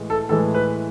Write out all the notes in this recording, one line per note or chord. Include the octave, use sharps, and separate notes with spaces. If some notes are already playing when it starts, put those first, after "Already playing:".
Already playing: A2 E3 G#3
A4
A2 E3 G#3 A4
B4